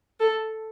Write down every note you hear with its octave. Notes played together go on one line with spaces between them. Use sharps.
A4